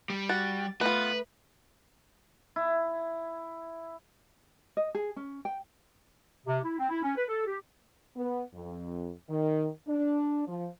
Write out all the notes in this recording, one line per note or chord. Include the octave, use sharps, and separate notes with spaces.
G3
F#4 A6
A3 B3 F4 B4
E4
D#5
G#4
C#4
G5
C3
E4
C4
E4
C#4
B4
A4
G4
B3
F2
D#3
D4
F3